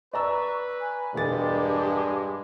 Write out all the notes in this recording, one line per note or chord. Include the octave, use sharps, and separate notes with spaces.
B4 D5 A#5 C#6 E6
G#5
E1 G2 G#3 G4 G#4 A6